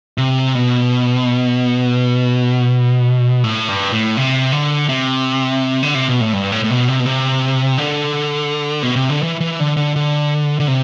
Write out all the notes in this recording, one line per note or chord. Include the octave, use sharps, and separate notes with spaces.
C3
B2
A2
G2
A2
C3
D3
C3
D3
C3
B2
A2
G2
A2
A2
B2
C3
B2
C3
D3
B2
C3
D3
E3
E3
D3
D3
D3
D3
C3